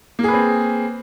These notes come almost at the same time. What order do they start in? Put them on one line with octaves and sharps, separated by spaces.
A#3 G#4 B4 C4